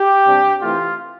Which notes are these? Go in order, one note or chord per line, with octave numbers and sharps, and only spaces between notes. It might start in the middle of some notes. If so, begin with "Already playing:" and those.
Already playing: G4
C3 G3 D4
E3 A3 C4 F4